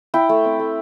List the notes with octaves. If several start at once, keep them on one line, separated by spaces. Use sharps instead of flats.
E4 G5
A3
C4
A3